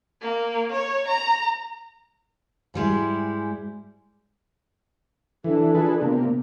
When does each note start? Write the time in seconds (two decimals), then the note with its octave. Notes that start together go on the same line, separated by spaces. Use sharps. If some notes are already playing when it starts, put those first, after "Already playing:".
0.21 A#3
0.72 C#5
1.08 A#5
2.74 G#2 G3 G#3 E4
5.44 E3 D4 A4
5.75 F4 G#4 A4 B4
6.01 C3 A#3 B3